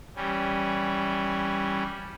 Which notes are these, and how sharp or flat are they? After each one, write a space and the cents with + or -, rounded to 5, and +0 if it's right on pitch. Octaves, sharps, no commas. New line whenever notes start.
E3 +0 G3 +0 C#4 +0